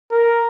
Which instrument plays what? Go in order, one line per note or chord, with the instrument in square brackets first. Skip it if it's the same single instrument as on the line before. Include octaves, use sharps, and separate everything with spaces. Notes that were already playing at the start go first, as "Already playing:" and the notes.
[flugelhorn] A#4